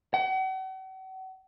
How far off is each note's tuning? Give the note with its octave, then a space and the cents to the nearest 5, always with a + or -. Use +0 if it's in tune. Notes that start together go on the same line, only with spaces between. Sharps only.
F#5 +40